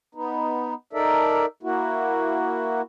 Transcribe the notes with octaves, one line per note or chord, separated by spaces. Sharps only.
B3 D#4
D#4 A4 A#4 D5 E5
A#3 E4 F#4